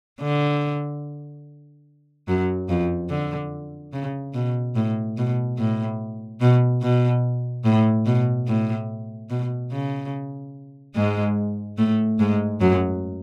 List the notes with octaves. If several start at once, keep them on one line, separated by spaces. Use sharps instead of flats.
D3
F#2 F#3
F2 F3
D3
C#3
B2
A2
B2
A2
B2
B2
A2
B2
A2
B2
C#3
G#2 G#3
A2 A3
G#2 G#3
F#2 F#3